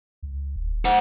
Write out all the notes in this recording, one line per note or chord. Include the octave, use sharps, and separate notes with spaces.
C#2
D#1
C5 F#5